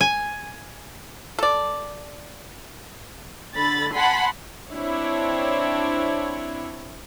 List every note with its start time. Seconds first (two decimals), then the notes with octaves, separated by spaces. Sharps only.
0.01 G#5
1.39 A4 D5
3.55 D3 B5 A6
3.93 F#5 G#5 A5 B5 C6
4.70 C4 D4 E4 C#5